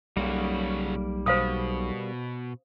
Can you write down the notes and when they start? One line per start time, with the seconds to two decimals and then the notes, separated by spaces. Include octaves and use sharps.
0.17 B1 C#3 G3 A#3 F#4
1.26 B2 C5 F5 D#6